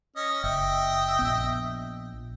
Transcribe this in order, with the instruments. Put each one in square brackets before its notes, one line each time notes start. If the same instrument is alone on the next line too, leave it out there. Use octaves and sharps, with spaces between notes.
[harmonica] C#4 D#5
[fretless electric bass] F#1 [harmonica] D#5 E5 G5
[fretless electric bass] A#1 B3